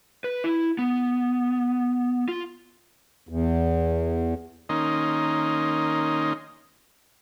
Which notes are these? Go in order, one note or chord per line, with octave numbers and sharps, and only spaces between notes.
B4
E4
B3
F4
E2
D#3 A#3 C#4 D#4 D#5 C6